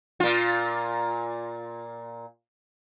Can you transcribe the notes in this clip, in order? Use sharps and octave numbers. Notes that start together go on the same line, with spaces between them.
A#2 F4